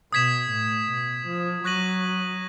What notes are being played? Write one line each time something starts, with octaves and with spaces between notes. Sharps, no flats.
B2 D#6 G#6 B6 E7
A2
B2
F3
F#3 C#6 F#6 A#6 D#7 F#7